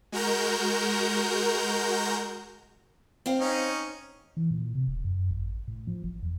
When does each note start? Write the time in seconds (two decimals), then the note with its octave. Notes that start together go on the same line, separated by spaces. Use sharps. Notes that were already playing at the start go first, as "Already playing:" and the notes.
0.12 G#3 F#4 A#4 A#5 G6
3.26 C4 C5 F5
3.40 C#4 D#4
4.37 E3
4.51 A#2
4.75 C3
4.88 D#1
5.05 F#2
5.31 G#1
5.68 A2
5.87 F3
6.04 G1
6.23 E2